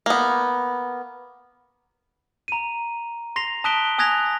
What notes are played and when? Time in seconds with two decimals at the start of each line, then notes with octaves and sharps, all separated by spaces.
0.06 A#3 B3
2.48 A#5 D#7
3.36 C6 A#6 C7 F7
3.64 A5 D#6 F#6 B6 D7 G7
3.98 G#5 D#6 F#6 G#6 A#6 F7